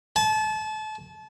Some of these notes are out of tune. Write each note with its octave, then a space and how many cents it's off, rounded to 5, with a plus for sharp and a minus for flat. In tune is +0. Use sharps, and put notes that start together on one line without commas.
A5 -30